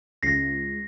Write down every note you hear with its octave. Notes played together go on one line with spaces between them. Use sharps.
C#2 A#6 C7